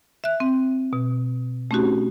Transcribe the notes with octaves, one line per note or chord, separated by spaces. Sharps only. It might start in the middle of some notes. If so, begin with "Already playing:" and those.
E5 F#6
C4
B2
A3 C4 C#4 D#4 F#4 G4